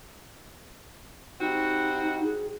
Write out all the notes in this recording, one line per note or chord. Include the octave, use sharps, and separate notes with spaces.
G3 C4 D#4 F#4
G#4